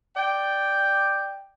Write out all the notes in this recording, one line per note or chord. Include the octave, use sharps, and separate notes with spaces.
D5 G5